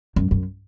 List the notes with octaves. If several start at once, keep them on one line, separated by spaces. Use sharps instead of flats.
F#2
F#2